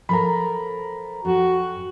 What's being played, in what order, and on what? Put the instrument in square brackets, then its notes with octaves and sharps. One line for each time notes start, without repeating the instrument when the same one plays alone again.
[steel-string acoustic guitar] F3 A4 A#4 [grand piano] A#5 B5
[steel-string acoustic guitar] F2 [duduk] F#4